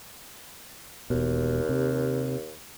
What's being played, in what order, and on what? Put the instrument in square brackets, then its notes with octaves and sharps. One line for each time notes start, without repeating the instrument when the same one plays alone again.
[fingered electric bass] E1 B2 [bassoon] D#2
[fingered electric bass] C3